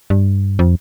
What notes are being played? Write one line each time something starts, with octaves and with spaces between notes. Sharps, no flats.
G2
F2